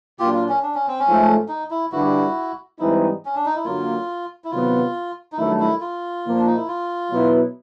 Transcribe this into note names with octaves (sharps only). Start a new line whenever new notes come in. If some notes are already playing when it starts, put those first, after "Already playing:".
A#2 F#3 A#3 D4 F4 G4
F4
C#4
D4
C#4
C4
C#4
G#2 F3 A3
D#4
E4
G2 D3 G3 E4 F#4
G#2 E3 G3 C4 D#4 E4
C#4
D4
D#4
E4
F#2 D3 F#3 A#3 F4
E4
C3 D#3 F#3 B3 F4
D#4
G2 D#3 F#3 A3 E4
E4
F4
A#2 F3 A#3
D4
D#4
E4
F4
B2 F#3 B3 E4